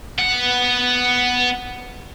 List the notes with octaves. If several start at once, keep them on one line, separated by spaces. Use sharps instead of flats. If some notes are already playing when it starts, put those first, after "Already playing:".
B3 F#5